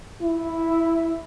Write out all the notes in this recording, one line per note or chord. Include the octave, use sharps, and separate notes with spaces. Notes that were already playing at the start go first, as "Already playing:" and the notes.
E4